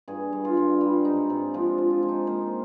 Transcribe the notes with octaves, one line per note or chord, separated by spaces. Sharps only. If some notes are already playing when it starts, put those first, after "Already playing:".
G2 G#4
G2
F4
G2
G3 F4
G#2 D#4
G#2 C4
F3 D4
F3
F4
G#3
D#4
A#3 C5